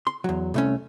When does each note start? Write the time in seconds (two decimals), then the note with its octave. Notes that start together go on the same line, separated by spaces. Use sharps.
0.07 C6
0.24 E2 F#3
0.54 C2 A3 C#4